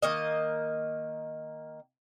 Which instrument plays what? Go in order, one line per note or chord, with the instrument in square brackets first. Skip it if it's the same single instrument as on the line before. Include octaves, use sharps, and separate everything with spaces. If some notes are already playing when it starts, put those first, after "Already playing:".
[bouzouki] D#3 A#3 D#5